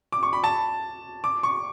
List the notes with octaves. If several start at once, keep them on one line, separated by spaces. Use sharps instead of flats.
D6
C#6
B5
A5
D6
C#6